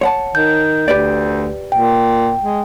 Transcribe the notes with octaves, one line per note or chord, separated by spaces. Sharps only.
C#5 F#5 A5
D#3 G6
D2 G4 B4 D5
A#2 G5
G#3